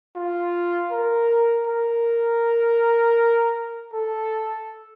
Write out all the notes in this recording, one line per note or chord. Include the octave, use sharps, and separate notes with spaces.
F4
A#4
A#4
A4